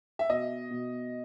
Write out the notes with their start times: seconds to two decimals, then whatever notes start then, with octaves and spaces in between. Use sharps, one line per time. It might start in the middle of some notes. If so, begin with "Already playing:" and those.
0.19 E5
0.29 B2 D#5
0.71 B2